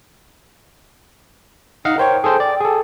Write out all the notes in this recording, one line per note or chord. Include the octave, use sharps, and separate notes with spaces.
D#4 D#5 F5 F#5
A#4 C5 C#5 G5
G#4 A4 C5
D5
G#4 A4